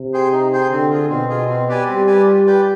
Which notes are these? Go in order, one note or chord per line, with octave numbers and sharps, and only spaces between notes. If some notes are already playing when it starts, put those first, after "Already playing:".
Already playing: C3
G#4 C5 G5
D#4
G#4 C5 G5
D3 C4
F4 G#4
B2 C4
F4 G#4
C4
G4 B4 D5 G#5
G3 C4
G4 B4 D5 G#5
F4
B4 D5 G5